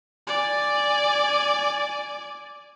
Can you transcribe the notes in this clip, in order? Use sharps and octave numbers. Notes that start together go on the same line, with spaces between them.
D5 G#5